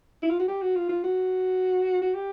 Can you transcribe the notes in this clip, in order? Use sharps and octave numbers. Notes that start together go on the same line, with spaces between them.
E4
F4
F#4
G4
F#4
F4
F4
F#4
F#4
G4